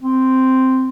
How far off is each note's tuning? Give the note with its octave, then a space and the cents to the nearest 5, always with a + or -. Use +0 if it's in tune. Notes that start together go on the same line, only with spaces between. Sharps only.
C4 -5